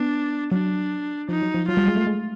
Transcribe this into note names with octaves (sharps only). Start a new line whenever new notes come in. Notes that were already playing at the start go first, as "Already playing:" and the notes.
Already playing: B3 D4
F#3 D4
F3 D#4
F#3
F3
F#3 F4
G3
G#3
A3
G#3